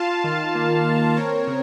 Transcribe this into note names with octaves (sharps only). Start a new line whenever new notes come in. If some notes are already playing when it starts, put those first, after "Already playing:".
Already playing: F4 F5 A5
D#3
A#3
D#3
C4 A#4 C#5
C#3